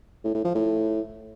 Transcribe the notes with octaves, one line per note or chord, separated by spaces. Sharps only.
A2
A2
F3
A2